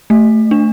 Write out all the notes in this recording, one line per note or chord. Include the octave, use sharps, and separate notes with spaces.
A3
D4